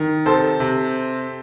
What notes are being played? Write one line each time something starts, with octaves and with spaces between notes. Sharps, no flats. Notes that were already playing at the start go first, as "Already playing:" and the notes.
Already playing: D#3
C3 A4 C5
C3